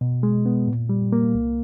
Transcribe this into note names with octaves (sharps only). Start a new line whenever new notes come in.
B2
G#3
B3
A#2
G3
A#3
C2